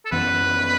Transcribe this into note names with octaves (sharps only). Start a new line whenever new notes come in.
A4
F#2 E3 B3 B4